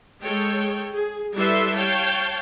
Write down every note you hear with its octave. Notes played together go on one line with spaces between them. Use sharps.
G#3 A4 C#5 G5
G#4
G3 E4 A4 B4 E5 C6
C#5 F5 G5 A5